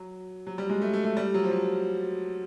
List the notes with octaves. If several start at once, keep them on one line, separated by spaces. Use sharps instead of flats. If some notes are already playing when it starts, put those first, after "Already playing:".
Already playing: F#3
F#3
G3
G#3
A3
A3
A3
G3
F#3
F3
F#3